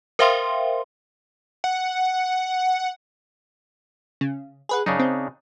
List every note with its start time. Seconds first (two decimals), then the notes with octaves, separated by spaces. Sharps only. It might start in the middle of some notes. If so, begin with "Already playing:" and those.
0.19 A#4 C5 E5 F5 G5 C6
1.64 F#5
4.21 C#3
4.69 G#4 B4 F#5
4.86 F#2 C#3 D4 D#4
4.99 C4